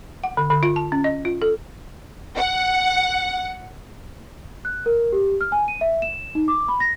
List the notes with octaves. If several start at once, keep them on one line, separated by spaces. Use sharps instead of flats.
F#5
D3
D3
F4
A5
C#4
D#5
F4
A4
F#5
F#6
A#4
G4
F6
G#5
D#7
E5
E7
D#4
D6
B5
A#6